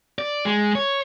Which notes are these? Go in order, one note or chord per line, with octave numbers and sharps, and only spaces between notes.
D5
G#3
C#5